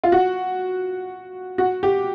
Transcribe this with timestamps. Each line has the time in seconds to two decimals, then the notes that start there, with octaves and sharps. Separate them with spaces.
0.04 F4
0.12 F#4
1.58 F#4
1.83 G4